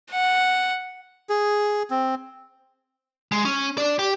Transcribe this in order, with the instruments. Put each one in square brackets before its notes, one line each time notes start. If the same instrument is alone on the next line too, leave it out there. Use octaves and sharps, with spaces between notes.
[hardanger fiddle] F#5
[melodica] G#4
C4
[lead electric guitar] G#3
C#4
D4 D5
G4